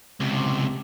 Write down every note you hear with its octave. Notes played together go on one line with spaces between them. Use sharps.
C#2 C3